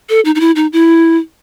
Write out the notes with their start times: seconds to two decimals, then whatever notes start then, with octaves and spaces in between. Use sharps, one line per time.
0.09 A4
0.25 D#4
0.35 D#4
0.40 E4
0.56 D#4
0.73 E4